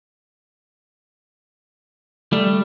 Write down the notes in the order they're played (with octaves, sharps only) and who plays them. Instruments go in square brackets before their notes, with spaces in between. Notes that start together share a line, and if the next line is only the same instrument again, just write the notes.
[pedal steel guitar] G3 [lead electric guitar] A3